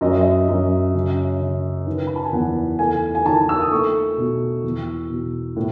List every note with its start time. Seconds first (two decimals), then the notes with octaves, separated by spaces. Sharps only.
0.01 F#2 D#5
0.11 E5
0.21 D#5
0.48 F#2
0.94 C#3
1.40 C#3
1.86 D#3 B4
2.07 B5
2.16 A5
2.24 G#5
2.32 E2 F#5
2.79 A3 G#5
3.15 G#5
3.26 D#3 A5
3.49 E6
3.60 D#6
3.71 A3 C#6
4.18 B2
4.64 E2
5.10 B2
5.56 A2